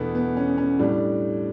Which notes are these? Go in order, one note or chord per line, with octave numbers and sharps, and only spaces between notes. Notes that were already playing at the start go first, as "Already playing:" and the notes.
Already playing: E2 B2 A3 B3 D4
B3
C#4
C#4
A2 G3 D4